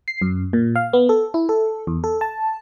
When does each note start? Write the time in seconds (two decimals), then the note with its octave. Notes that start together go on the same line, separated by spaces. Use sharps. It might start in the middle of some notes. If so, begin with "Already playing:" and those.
0.08 C7
0.22 F#2
0.53 A#2
0.76 F5
0.93 B3
1.09 A4
1.34 E4
1.49 A4
1.87 E2
2.04 A4
2.21 A5